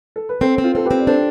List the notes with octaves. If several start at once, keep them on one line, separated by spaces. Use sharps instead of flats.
A4
B4
C4 A4 C5
C4
F4 A4
C4 A4
G4 B4
C4
D5
D4 A4 C5